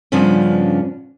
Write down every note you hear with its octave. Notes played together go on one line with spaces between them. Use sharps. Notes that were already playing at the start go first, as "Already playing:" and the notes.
G2 C#3 F3 B3 C#4 D4